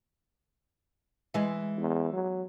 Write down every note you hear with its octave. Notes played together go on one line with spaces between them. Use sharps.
E3 G#3
E2
F#3